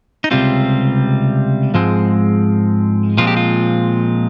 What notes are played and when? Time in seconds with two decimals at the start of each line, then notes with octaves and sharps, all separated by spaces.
0.24 D#4
0.31 C#2 C3 G3 C4 F4
1.74 G#2 F3 G#3 C4
3.18 A#2 F3 G#3 C4 F4
3.27 G4
3.37 F4